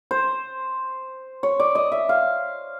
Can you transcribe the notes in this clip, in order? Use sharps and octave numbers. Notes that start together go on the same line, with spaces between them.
C5
C#5
D5
D#5
E5
F5